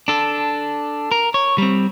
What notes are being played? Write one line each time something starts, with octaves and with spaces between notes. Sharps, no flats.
D4 A4
A#4
C#5
G3 C4